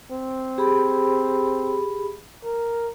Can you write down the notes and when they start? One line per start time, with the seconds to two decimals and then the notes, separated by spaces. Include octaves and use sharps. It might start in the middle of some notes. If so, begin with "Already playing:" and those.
0.11 C4
0.58 G4 G#4 B5
2.45 A#4